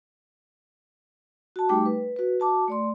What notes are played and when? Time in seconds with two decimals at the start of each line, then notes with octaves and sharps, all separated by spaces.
1.56 F#4 A5
1.69 G3 A3 D#4 G4 G5 D6
1.86 B4
2.16 F#4 B4
2.40 F#4 A5 D6
2.68 A3 D5 C6